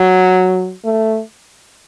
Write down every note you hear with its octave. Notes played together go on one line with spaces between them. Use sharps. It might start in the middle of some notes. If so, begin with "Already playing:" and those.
Already playing: F#3
A3